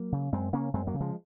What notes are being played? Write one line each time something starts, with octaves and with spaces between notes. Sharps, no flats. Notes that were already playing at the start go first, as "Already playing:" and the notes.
Already playing: F#3 A#3
C#3
F#2 G#3 C4
C#3 A#3 C#4
F#2 G#3 C4
F#3 A#3
C#3
F3 G#3